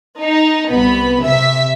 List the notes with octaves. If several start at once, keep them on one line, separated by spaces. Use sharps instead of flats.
D#4
C2 B3 B5
C3 E5 B6